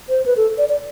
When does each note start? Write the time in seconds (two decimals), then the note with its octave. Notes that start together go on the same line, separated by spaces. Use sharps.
0.09 C5
0.26 B4
0.37 A4
0.58 D5
0.69 D5